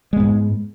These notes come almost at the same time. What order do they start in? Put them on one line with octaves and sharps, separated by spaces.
G#3 B3 G#2